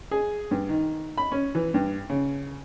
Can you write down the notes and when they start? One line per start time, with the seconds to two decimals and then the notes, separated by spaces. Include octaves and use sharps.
0.11 G#4
0.51 G2
0.69 D#3
1.18 B5
1.32 C#4
1.55 E3
1.74 G2
2.10 C#3